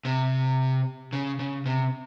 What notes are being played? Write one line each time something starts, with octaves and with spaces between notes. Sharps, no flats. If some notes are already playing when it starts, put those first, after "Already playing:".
C3
C#3
C#3
C3